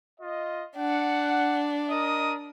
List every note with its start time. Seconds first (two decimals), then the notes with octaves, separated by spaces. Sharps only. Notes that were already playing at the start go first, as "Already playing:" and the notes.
0.20 F4 D#5
0.77 D4 F#5
1.90 A#4 D#5 D#6